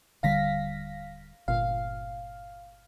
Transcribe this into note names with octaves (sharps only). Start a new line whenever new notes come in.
D#1 D3 G3 F5 A#6 B6
G1 A#2 F5